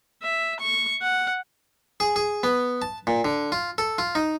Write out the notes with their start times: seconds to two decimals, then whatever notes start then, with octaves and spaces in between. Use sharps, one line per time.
0.22 E5
0.60 C#6
1.02 F#5
2.00 G#4
2.16 G#4
2.43 B3
2.82 A5
3.07 A#2
3.25 D3
3.52 F4
3.78 A4
3.98 F4
4.15 D#4